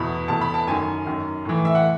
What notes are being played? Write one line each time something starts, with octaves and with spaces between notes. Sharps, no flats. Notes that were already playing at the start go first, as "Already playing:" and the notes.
Already playing: E2 B2 B5
E2 B2 A5
B5
A5
F#2 D#3 G#5
F#2 D#3
A2 E3
E5
F#5